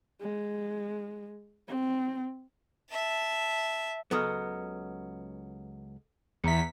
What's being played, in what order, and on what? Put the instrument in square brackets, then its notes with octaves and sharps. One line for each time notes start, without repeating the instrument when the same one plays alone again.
[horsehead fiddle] G#3
C4
[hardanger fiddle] E5 A5
[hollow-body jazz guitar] C#2 F#3 B3 [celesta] A4 D#6 F6
[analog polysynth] E2 B6 [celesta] E5 A#5 C#7